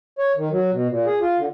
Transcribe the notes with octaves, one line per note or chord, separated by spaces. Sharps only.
C#5
D#3
F#3
B2
A#2
G#4
F4
D3